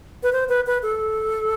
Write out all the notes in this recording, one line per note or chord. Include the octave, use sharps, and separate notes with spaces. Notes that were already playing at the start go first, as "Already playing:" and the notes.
B4
C5
B4
B4
A4